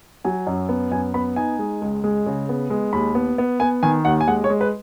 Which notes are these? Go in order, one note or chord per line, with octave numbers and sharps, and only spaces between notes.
F#3 G#5
F#2
B3
F#2 G#5
B3 B5
D#4 G#5
G#3
C#2
G#3
C#3
B3
G#3
D#2 B5
B3
B3
B3 G#5
D#3 G#5
D#2 F#5
G#5
G#3 F#5
C#5
G#3
B4